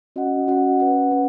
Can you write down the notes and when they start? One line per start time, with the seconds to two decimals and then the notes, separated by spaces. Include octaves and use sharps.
0.16 C#4 F#4 D#5 F#5
0.48 C#4 F#4 D#5 F#5
0.80 C#4 B4 F#5
1.11 C#4 B4 F#5